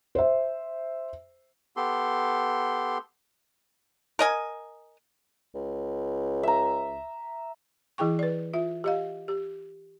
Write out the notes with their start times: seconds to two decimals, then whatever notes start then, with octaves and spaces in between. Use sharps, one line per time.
0.15 C5 E5
1.76 B3 G4 A4 C6
4.19 A#4 D#5 G#5
5.55 C#2
6.43 E5 A#5
7.98 E3 E4 G#4 G5 C#6
8.19 B4 D5
8.53 F4 E5
8.84 G4 D#5 F5
9.28 G4